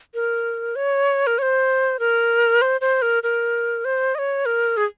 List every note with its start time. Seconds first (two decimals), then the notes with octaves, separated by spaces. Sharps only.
0.14 A#4
0.76 C#5
1.27 A#4
1.38 C#5
1.42 C5
1.99 A#4
2.62 C5
2.81 C5
3.02 A#4
3.23 A#4
3.85 C5
4.15 D#5
4.19 C#5
4.46 A#4
4.77 G#4